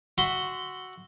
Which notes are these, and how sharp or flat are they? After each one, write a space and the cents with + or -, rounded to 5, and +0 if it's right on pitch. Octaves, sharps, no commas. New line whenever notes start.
F#4 +0 E5 +0 C6 -15